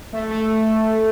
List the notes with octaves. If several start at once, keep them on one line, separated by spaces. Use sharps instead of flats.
A3
A3